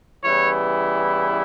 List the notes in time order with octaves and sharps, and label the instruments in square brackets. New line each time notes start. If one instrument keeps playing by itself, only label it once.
[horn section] C#3 E3 G3 B3 E4 C#5